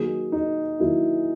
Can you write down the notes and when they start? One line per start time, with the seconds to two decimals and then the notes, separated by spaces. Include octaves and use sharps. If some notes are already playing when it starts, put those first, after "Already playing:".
Already playing: D#3 F#3 A#3 G#4
0.32 D#4
0.80 D#3 F#3 A#3 E4